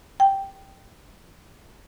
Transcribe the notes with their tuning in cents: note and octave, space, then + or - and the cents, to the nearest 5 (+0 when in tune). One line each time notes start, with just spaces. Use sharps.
G5 -5